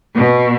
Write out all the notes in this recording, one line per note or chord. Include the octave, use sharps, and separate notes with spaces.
B2